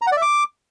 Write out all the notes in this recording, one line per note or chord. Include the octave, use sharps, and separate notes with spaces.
A#5
F#5
D5
E5
D6